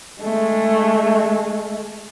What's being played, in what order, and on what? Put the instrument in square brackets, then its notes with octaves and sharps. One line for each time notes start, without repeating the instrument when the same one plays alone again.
[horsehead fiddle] G#3 A3